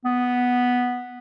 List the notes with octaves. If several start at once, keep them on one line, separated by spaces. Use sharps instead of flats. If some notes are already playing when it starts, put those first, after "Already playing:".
B3